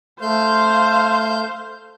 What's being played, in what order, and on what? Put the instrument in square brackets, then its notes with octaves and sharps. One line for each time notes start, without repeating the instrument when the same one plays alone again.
[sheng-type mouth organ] A3 C6 G6 [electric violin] C5 F5